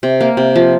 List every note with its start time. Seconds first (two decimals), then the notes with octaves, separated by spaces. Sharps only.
0.03 C3
0.21 A#3
0.37 C3
0.55 F3